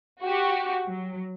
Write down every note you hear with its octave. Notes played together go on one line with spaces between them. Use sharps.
F#4 G4
F#3